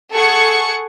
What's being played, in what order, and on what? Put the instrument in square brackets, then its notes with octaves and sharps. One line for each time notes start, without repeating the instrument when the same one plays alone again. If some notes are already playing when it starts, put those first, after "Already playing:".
[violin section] G#4 A4 F#5 C#6 G#6 C#7